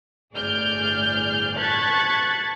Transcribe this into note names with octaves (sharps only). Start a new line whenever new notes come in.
G1 A2 G#4 D5 F6 G6
A5 C#6 F#6 G#6 A6 B6